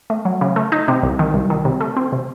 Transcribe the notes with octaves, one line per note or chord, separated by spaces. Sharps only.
A3
F#3
C#3
A3
D#4
C3
C2
D#3
C2
D#3
C3
A3
C4
C3